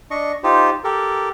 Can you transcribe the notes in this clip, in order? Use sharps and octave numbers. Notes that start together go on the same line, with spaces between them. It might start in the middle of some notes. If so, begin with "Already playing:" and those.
D4 D#5 C#6
D#4 F4 G4 C5
G4 A4 A#4